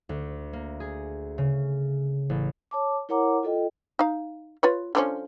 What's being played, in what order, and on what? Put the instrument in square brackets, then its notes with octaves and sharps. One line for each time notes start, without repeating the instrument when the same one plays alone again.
[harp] D2
A#3
G#4
C#3
A1
[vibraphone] C#5 A5 D6
E4 A#4 C#5 F#5 A#5 D6
F4 A4 D#5 G5
[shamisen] D#4 F5
F4 B4 C#5
D3 F3 C#4